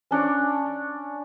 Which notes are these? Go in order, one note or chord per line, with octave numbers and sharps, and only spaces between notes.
C#4 D4 C#5 D6